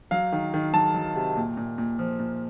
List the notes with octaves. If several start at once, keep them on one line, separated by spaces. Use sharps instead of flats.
F#3 F5
D#3
D#3
F#3 A5
F#3
C3
A#2
A#2
A#2
F3
A#2